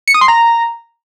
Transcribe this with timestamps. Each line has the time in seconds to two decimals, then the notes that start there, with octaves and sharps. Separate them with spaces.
0.08 C#7
0.14 D#6
0.21 C6
0.28 A#5